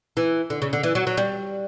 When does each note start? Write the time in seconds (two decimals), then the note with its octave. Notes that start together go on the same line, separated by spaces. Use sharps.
0.17 E3
0.50 D3
0.62 C#3
0.73 D3
0.83 E3
0.95 F#3
1.07 F#3
1.17 G3